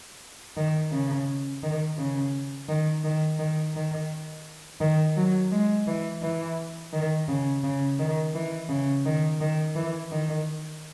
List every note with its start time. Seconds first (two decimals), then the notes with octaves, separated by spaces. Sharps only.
0.57 D#3
0.92 C#3
1.63 D#3
1.98 C#3
2.69 D#3
3.04 D#3
3.39 D#3
3.75 D#3
4.81 D#3
5.17 F#3
5.52 G#3
5.87 E3
6.22 E3
6.93 D#3
7.28 C#3
7.64 C#3
7.99 D#3
8.35 E3
8.70 C#3
9.06 D#3
9.41 D#3
9.76 E3
10.11 D#3